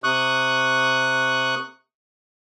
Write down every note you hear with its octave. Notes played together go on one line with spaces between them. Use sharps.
C3 C#6 D#6 F#6